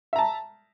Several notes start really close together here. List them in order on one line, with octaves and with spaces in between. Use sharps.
E5 A#5 A5